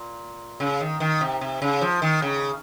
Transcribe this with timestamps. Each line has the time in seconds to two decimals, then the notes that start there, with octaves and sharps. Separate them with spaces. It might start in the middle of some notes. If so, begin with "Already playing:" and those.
Already playing: A#2
0.60 C#3
0.81 D#3
1.00 D#3
1.21 C3
1.41 C3
1.62 C#3
1.81 F3
2.02 D#3
2.22 C#3